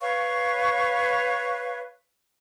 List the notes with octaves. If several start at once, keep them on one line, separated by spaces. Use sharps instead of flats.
B4 C#5 F5 C#6